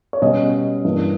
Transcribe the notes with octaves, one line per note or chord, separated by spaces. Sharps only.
C#5
B2 G3 C#4 D#5
G2 E3 A#3